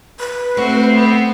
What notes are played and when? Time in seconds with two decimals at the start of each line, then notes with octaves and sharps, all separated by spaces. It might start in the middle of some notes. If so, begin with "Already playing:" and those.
0.20 B4
0.57 A3 C4 F#4
0.94 B3